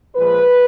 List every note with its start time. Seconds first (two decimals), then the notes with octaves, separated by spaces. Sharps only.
0.15 A#2 F3 G#3 B4